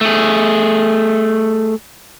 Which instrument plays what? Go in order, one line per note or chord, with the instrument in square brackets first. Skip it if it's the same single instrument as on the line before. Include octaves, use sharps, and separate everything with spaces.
[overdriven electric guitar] A3 G#4